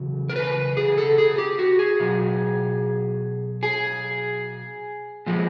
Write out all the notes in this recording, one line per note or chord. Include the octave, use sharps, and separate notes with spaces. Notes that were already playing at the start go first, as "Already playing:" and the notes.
Already playing: E2 C#3 F#3
A#4
B4
G#4
A4
G#4
G4
F#4
G#4
B2 F#3
G#4
A#2 F3 G#3